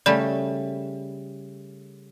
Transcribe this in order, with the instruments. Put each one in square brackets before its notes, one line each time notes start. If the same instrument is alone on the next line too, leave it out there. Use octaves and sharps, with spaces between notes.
[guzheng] C#3 G3 A3 [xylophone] D5 B5